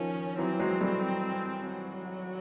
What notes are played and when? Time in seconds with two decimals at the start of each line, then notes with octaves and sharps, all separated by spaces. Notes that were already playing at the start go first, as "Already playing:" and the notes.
Already playing: D#3 F3 C#4
0.38 E3 F#3 C4
0.59 F#3 G#3
0.81 G3 A3
1.66 F#3